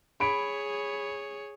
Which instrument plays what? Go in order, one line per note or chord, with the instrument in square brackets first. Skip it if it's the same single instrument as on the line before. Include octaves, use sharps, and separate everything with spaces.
[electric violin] G#4 C#5 [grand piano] B5 D7